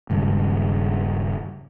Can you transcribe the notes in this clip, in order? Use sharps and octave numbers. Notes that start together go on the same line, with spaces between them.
D#1 G2 C#3 G#3